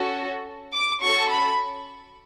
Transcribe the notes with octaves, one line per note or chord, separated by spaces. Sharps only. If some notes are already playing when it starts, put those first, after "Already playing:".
Already playing: C#4 F#4 A4
D6
C#4 F#4 A4 C#6
B5